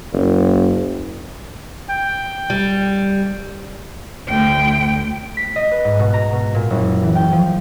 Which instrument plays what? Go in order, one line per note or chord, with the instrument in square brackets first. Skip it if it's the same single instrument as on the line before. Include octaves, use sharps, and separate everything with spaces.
[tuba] F#1
[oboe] G5
[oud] G3
[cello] D2 G5
[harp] B6
D#5
B4
G#2
B2
A#5
B2
A#2
F#1
E3
G5
F3